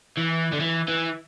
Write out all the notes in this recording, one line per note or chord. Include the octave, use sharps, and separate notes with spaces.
E3
D3
E3
E3